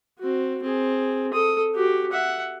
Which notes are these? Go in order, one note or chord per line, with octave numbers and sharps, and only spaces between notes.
C4 F#4
C4 G#4
A4 D#6
F#4 G4
E5 F#5